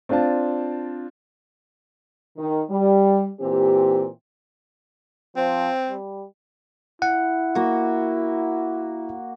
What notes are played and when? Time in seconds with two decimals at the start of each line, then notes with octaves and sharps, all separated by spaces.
0.09 C4 D4 F4 D5 A5
2.37 D#3
2.70 G3
3.40 A#2 E3 C4 G4
5.36 F3 C4
5.89 G3
7.02 E4 F#5
7.55 A#3 F#4